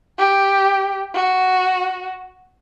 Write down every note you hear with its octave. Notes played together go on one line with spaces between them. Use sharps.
G4
F#4